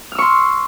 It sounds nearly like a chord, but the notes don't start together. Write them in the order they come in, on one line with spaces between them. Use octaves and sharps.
F6 E6 C#6 C6